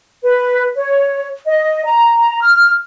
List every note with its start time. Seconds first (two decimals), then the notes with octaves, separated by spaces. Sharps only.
0.23 B4
0.76 C#5
1.46 D#5
1.85 A#5
2.43 F6